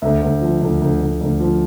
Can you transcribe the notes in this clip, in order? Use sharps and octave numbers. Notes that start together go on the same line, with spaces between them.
D2 E5
D2
F3
D2
D2
D2
D2
F3